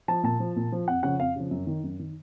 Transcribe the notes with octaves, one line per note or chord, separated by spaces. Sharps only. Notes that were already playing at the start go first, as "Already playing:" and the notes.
F3 A5
A#2 A5
F3
A#2
F3
F2 F#5
C#3 F3 F#5
F2 F5
C#3 F3
F#2
D#3
F#2
D#3